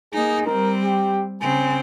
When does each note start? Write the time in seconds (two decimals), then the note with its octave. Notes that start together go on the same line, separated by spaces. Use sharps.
0.13 A#3 D#4 G#4
0.46 G3 C4 A#4
0.85 G4
1.41 C#3 C4 G#5